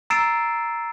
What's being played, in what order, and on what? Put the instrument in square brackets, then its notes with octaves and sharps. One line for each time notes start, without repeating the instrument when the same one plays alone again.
[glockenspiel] A#5 E6 A6 C7 D7 E7